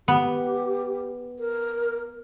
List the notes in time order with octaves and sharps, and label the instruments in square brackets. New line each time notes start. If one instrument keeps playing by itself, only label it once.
[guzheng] B3 [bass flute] G4
[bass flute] A#4